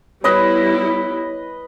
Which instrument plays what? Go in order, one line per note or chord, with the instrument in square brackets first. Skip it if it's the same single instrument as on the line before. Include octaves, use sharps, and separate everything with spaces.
[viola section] G3 B3 E4 [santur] B4 D#5 B5 [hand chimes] C#5